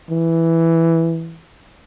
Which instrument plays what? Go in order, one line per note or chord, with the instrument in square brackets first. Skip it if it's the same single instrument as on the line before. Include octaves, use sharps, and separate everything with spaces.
[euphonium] E3